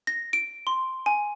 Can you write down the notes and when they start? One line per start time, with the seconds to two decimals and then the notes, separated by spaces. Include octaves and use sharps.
0.07 A#6
0.33 D7
0.67 C6
1.06 G#5